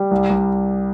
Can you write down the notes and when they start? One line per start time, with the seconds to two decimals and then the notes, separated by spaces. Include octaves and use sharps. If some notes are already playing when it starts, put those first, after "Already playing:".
Already playing: G3
0.11 C2
0.30 C2